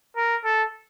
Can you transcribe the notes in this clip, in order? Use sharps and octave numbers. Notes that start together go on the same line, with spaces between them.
A#4
A4